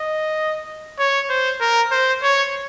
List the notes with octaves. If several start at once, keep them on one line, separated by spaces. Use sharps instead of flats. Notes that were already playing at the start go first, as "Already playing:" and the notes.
Already playing: D#5
C#5
C5
A#4
C5
C#5